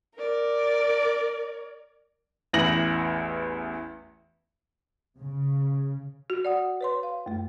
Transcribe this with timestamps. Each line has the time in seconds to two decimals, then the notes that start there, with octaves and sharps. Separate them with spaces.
0.16 A#4 D5
2.53 A1 E2 A#6 F#7
5.18 C#3
6.30 F#4
6.45 D5 F#5 D#6
6.81 B4 C#5 C6
7.03 F5
7.26 F#2 A3